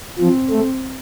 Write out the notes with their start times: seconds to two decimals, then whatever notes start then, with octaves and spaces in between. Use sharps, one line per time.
0.19 F3 C4
0.50 A3